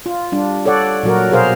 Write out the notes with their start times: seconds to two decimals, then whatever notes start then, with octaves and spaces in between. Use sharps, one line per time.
0.06 F4
0.32 G3 D4
0.66 A4 C#5 D5 F#5
1.03 A#2 F#3 F#4 A#4
1.31 B2 G#4 A#4 C5 F5